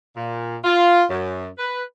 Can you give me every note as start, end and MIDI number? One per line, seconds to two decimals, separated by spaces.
0.17 0.56 46
0.64 1.04 65
1.10 1.48 42
1.58 1.83 71